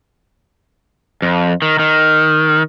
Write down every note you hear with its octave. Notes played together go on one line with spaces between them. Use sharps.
F2
D#3
D#3